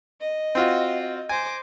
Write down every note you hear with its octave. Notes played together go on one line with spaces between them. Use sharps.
D#5
C4 F4 F#4
C5 G#5 D6 A#6